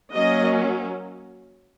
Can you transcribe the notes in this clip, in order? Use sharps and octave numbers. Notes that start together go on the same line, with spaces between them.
F#3 A#3 C#4 D#5